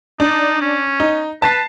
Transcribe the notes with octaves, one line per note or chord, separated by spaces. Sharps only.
D4 D#4
C#4
D#4
B4 A5 A6 C7